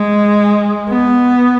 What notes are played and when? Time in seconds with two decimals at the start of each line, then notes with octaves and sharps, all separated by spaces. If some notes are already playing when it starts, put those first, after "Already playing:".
Already playing: G#3
0.89 B3